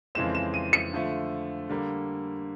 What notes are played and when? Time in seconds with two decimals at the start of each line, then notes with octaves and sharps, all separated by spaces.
0.15 F2 C#3 E3 G#3 C4 E7
0.35 E7
0.54 D#7
0.73 C#7
0.93 D3 F3 A3
1.70 D3 G3 A#3